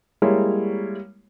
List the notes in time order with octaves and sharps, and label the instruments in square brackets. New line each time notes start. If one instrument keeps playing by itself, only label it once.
[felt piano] G3 G#3 A#3 E4 C#5